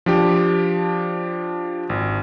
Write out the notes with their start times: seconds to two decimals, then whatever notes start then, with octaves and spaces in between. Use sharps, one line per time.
0.06 F3 D4 G4
1.89 G#1